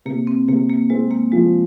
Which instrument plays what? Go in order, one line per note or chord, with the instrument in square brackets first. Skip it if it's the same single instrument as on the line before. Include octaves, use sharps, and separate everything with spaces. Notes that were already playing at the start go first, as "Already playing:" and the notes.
[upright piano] C3 [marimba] A#3
[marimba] C4
[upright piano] C3 [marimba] A#3
[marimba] A#3
[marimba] G#3 [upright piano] C4
[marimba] A#3
[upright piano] F3 [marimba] G#3